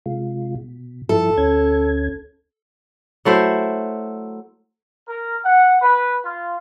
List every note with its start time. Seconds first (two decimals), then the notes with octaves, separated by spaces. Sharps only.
0.06 C3 G#3 F4
0.55 B2
1.09 G2 F3 E4 A4
1.38 D2 C#4 G#6
3.25 F#3 A3 E4 C5
5.09 A#4
5.45 F#5
5.82 B4
6.25 F4